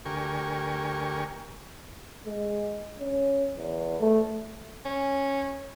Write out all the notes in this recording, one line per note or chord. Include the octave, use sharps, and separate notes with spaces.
D2 G4 A#4 G#5 C#6
G#3
C#4
E2
A3
C#4